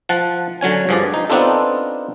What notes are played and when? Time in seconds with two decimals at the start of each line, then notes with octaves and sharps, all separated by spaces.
0.09 F3 F#5 A5
0.61 D3 F#3 C#4 G#5
0.89 G2 F3 G#4 D5
1.14 D#4
1.30 B3 C4 D4 D#4 F4 A4